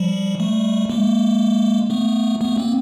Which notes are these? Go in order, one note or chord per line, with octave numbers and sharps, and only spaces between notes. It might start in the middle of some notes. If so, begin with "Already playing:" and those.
Already playing: F3 G3
G3 A3
G#3 A#3
A3 B3
A3 B3
A#3 C4